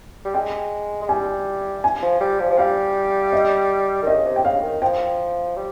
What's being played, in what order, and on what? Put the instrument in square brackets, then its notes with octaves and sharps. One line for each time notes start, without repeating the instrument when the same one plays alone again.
[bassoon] G3
[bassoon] G#3 [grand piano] G5
[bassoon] G#3
[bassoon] G3 [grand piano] G#5
[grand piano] G#5
[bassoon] F3
G3
F3
F3
[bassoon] G3 [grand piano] F5
[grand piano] D#5
[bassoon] D#3 [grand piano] D#5
[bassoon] C#3
C3
[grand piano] G5
[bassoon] C#3 [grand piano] F5
[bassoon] D#3
[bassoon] F3 [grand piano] G5
[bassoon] G3